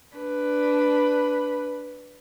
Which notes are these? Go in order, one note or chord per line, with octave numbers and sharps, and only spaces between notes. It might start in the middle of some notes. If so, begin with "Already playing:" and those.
D4 B4